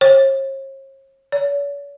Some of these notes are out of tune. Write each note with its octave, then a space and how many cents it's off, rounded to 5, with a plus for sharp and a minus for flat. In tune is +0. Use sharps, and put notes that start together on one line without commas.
C#5 -45
C#5 +45